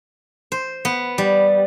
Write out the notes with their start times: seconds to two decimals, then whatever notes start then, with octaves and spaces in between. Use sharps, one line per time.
0.52 C5
0.85 B3
1.18 G3